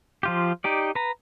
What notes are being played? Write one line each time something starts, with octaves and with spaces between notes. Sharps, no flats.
F3 F4 G4
D#4 G4 D5
B4 A#5